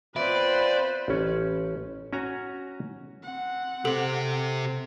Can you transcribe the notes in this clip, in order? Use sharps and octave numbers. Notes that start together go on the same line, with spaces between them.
B3 C4 F4 B4 C5 D5 E5 B5
A1 C#4
C#4 F#4 G#5 A#5
C4 F#5
C3 G4 A4 C5